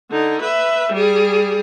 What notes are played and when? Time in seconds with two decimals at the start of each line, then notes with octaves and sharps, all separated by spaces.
0.11 D3 D#4
0.41 B4 E5
0.93 G3 G#4